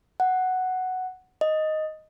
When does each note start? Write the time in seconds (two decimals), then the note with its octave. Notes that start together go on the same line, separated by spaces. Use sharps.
0.20 F#5
1.41 D#5